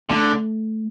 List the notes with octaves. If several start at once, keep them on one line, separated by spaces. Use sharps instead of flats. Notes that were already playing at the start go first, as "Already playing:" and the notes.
D3 A3